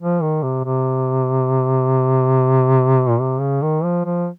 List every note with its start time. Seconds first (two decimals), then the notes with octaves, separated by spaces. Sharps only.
0.01 F3
0.22 D#3
0.43 C3
0.64 C3
3.09 A#2
3.20 C3
3.40 C#3
3.62 D#3
3.83 F3
4.05 F3